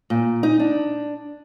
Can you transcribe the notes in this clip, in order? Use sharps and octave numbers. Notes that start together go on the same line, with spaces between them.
A#2
D#4
D4